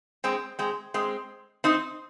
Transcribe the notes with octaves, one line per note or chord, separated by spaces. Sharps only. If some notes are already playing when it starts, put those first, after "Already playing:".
G#3 C4
G#3 C4
G#3 C4
C4 D#4